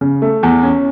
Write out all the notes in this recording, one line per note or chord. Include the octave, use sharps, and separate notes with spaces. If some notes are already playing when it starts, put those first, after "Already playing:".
C#3
A3
E2
C#4